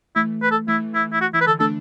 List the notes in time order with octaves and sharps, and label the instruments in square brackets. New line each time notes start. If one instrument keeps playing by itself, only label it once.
[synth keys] E3 A3 [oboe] E4
[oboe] B4
A4
[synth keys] E3 A3 [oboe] E4
[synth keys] E3 [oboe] E4
[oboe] E4
F#4
[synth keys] E3 [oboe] E4
[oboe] B4
[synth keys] D3 [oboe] A4
[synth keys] A3 D4 [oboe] A4